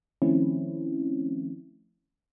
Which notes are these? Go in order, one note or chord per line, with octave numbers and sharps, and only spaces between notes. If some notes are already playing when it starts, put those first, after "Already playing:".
D#3 F3 A3 C4 C#4 E4